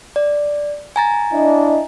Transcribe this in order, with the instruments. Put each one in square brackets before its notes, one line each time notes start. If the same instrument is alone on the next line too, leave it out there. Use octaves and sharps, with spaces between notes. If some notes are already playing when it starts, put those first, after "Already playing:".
[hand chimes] D5
G#5 A#5 A6
[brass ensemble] D4 E4 D#5